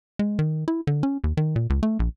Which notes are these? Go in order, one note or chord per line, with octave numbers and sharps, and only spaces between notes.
G#3
D#3
E4
D3
C#4
D#2
D#3
A#2
C#2
A3
A#1